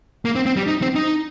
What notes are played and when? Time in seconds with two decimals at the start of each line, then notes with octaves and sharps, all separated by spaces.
0.25 A#3
0.36 C4
0.46 C4
0.57 G3
0.67 D#4
0.82 C4
0.95 D#4